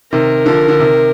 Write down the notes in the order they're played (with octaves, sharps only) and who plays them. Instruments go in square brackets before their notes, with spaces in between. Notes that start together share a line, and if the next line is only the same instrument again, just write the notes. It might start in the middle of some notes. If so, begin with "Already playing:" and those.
[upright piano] C3 D#3 [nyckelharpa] A#4
[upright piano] D3 F3
D3
C3 D#3